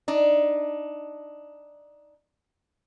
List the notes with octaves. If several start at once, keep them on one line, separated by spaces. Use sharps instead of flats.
D4 D#4